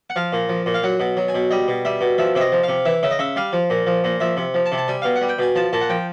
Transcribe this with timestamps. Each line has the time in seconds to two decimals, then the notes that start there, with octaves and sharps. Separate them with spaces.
0.10 F#5
0.16 F3 F5
0.33 A#2
0.49 F3
0.66 A#2
0.74 F5
0.83 F#3 F#5
1.00 B2
1.17 F#3
1.28 G#5
1.35 B2
1.51 G3 D#5
1.68 B2
1.85 G3 E5
2.01 B2
2.18 F3 E5
2.35 C3 E5
2.41 D#5
2.52 F3
2.63 F5
2.68 C3
2.85 E3 E5
3.03 C#3 E5
3.11 D#5
3.19 C#3 E5
3.36 G3 F5
3.53 F3
3.70 A#2
3.87 F3
4.04 A#2
4.20 F3 E5
4.37 C3
4.54 F3
4.66 A5
4.72 C3
4.78 A5
4.88 G3 G#5
5.02 B2 F5
5.16 F#5
5.21 G3
5.29 G5
5.39 B2 G#5
5.55 F3 A5
5.73 A#2 A5
5.81 F#5
5.89 F3 G5